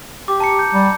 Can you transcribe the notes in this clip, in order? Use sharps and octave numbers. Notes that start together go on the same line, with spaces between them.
G4 D6
A5 A#5 C#7
G6
G3